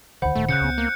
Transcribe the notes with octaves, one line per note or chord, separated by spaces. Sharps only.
D2 D3 D#3 C5 F#5 B5
D1 A#2 D#3 A3
C#3 F#6 G6 C#7
C#2 B3
A#3